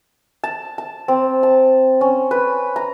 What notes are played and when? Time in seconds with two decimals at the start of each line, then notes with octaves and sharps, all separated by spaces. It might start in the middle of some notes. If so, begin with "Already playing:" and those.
0.44 A5
0.78 A5
1.08 C4
1.43 A5
2.01 C#4
2.31 B4
2.76 A#5